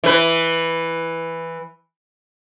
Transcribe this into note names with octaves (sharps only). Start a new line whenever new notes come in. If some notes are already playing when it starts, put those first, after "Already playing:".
E3 B4